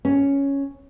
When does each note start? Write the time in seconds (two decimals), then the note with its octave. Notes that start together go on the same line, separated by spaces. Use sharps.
0.05 C#4